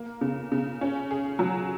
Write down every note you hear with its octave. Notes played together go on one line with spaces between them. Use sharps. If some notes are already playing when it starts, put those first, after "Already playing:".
Already playing: A#3
C#3
C#3
C#4
G#4
F#3